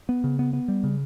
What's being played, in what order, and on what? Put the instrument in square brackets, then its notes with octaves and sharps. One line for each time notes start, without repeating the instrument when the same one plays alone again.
[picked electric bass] B3
C#3
B3
B3
G3
C#3